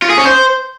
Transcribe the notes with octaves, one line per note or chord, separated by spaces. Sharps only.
F4
G#4
C#4
C5